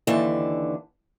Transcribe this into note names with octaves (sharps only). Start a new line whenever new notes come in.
D#2 D3 E3 A5